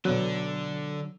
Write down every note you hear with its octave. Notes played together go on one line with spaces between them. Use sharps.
B1 D3 F#3 B3 D4 F#6